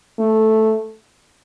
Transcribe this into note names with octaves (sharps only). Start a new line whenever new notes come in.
A3